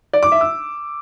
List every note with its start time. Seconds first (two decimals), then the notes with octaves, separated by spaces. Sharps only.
0.13 D5
0.23 D6
0.32 E5
0.41 E6